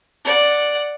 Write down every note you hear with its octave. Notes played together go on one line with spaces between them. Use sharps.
D5 F#5